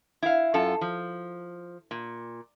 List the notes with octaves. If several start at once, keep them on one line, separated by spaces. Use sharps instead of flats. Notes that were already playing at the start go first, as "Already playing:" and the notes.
E4 F5
F#2 F4 A4
F3
A#2